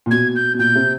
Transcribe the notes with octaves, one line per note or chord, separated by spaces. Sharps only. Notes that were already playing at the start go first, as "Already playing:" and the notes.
A#2
B2 G#6
G6
B2
A#2 G6
C3